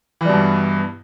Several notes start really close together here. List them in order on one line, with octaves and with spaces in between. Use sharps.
E3 G3 B2 G2